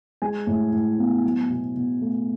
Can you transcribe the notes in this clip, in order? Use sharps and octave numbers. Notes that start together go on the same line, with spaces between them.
G#3 G#5
A2
A2
B3
F#3
B2
B2
A3